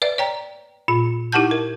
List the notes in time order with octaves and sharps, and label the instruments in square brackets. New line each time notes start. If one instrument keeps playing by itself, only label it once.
[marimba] B4 D5 E5
C#5 G5 A#5
A#2 F4
D#4 E4 G4 F#5 A5 G6
A#4